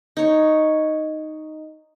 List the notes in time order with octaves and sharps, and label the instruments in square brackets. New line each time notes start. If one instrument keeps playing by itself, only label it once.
[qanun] D#4 C#5